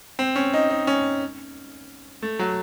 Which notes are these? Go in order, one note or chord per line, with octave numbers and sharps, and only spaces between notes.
C4
C#4
D#4
D#4
C#4
A3
F#3